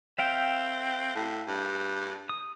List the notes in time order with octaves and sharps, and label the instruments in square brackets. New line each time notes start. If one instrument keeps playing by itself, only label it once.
[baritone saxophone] C4 [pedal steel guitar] E5 F5 G5
[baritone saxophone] A2
G2
[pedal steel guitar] D#6